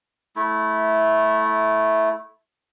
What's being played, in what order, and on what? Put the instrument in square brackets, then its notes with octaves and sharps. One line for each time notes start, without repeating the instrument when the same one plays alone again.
[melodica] A3 E4